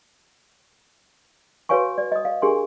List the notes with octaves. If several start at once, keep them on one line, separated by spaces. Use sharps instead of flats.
F#4 B4 C#5 F5 G#5 C#6
D5
D#5 D#6
D5 F5
D4 G4 G#4 A#4 G#5 C6